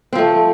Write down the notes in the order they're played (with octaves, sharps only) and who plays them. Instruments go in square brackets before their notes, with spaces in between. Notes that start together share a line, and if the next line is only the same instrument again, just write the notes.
[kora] C4
F3
A3